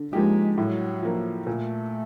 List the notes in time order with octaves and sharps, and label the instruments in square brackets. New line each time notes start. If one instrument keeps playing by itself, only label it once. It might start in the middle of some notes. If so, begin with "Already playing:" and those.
Already playing: [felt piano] D3
[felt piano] F3 A#3 D#4 G4 [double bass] G#3
[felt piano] A2 [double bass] F#3
[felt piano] F3 A#3
[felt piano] A#2 [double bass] A3